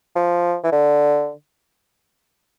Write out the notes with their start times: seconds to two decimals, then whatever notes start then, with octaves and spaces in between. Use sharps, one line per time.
0.16 F3
0.63 E3
0.72 D3